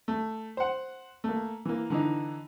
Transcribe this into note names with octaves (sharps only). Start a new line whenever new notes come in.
A3
C5 F#5
A3 A#3
E3 A#3
D3 E3 D#4